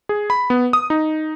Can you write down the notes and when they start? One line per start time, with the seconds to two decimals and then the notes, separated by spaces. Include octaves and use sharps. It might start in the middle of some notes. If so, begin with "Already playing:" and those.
0.09 G#4
0.30 B5
0.50 B3
0.73 D#6
0.90 D#4